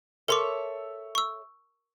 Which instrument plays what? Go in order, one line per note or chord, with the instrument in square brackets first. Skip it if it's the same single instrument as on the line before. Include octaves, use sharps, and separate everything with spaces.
[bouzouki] A4 C#5 E5 [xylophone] A#4 C6 D6
[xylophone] C#6 E6